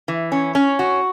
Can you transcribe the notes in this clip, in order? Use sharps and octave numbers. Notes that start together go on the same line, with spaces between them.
E3
C#4
C#4
F#4